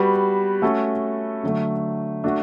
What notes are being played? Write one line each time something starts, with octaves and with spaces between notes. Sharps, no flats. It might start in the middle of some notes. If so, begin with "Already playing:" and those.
Already playing: G3 B3 F#4 B4
A3 C#4 F#4 A4
D3 F#3 A3
A3 D4 F#4